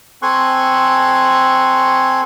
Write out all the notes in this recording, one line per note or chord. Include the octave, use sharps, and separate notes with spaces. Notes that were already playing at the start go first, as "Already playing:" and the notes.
C4 A4 G#5 C6 C#6 F#6